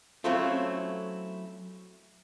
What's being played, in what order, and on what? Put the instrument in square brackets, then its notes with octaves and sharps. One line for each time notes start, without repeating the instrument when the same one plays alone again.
[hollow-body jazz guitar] F#3 A3 C4 C#4 E4 F4